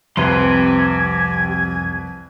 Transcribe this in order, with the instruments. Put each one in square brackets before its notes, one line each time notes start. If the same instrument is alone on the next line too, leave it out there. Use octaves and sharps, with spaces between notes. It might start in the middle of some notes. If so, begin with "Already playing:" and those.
[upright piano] C2 B4 [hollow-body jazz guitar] F2 [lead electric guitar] G4 C6 [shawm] G#5